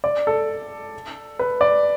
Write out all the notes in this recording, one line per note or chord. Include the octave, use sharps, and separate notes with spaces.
D5
A4
B4
D5